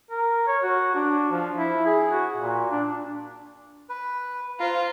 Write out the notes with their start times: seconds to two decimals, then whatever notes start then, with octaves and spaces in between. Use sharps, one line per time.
0.10 A#4
0.47 C#5
0.63 F#4
0.95 D4
1.31 F3
1.58 E4
1.85 G#4
2.10 F#4
2.37 A#2
2.71 D4
3.89 B4
4.60 F4 C5 F5 A#5